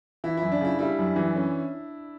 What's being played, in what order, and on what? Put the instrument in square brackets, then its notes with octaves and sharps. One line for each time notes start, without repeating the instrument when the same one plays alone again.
[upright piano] E3 [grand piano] E4
[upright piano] F#2 [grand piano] E4
[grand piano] D4
[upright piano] C#3 [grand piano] E4
[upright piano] G3 [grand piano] E4
[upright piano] F#2
E3
C#4